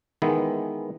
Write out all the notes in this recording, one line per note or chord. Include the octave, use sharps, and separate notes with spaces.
D#3 E3 G#3 B3 E4